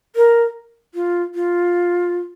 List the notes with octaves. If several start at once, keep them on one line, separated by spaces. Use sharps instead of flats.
A#4
F4
F4